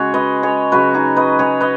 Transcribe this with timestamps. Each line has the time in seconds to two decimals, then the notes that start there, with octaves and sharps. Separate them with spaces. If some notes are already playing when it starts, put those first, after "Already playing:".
Already playing: C#3 G#3 F#4 G#4 C#5
0.14 B4 D#5
0.43 G#4 C#5
0.72 C#3 F#3 F#4 B4
0.94 D#4 G#4
1.16 B4 D#5
1.39 G#4 C#5
1.61 B4 D#5